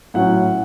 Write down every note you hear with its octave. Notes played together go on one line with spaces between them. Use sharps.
A2 F#3 C#4 F#5